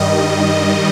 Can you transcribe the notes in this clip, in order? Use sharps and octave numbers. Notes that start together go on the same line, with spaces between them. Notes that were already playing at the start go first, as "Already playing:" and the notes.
Already playing: G2 D#3 G3 D#5